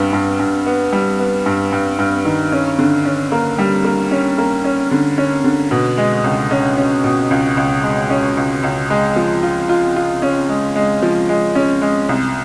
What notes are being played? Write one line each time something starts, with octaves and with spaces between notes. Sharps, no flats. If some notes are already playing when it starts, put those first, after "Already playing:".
Already playing: G2 G3 B3
G2
G2
B3
G3
B3
G2
G2
G2
D#3
C#4
D3
C#4
A#3
G3
A#3
C#4
A#3
C#4
D3
C#4
D3
B2
G#3
C#2
C#4
C#4
B2
C#2
C#2
G#3
C#4
C#2
C#2
G#3
F3
F4
F4
F4
C#4
G#3
G#3
F3
G#3
C#4
G#3
C2